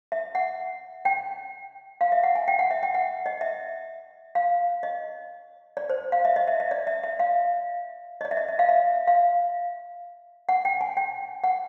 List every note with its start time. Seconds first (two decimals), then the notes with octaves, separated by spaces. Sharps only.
0.12 E5
0.35 F#5
1.05 G5
2.01 F5
2.12 E5
2.23 F#5
2.35 G#5
2.48 G5
2.59 F#5
2.71 E5
2.83 G5
2.94 F#5
3.26 D#5
3.41 E5
4.35 F5
4.83 D#5
5.77 D5
5.90 C5
6.12 F5
6.25 E5
6.36 D#5
6.48 E5
6.60 E5
6.71 D5
6.87 E5
7.03 E5
7.19 F5
8.21 D#5
8.25 D5
8.31 E5
8.37 D#5
8.48 E5
8.59 F5
8.69 E5
9.07 F5
10.49 F#5
10.65 G5
10.81 G#5
10.97 G5
11.44 F#5